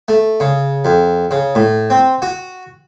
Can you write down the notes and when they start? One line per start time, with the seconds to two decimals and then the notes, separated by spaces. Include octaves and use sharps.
0.08 A3
0.40 C#3
0.85 F2
1.31 C#3
1.55 A2
1.90 C4
2.22 F#4